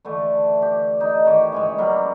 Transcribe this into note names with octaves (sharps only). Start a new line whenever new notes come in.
D3 E3 A3
G4
D#4
D#3 E3 C#5 D6
C#3 E3 G#3
F#3 G3 A#3 B3